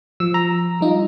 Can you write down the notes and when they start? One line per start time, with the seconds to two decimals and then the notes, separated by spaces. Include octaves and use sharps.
0.20 F3 E6
0.34 A#5
0.81 G3 D#4 F4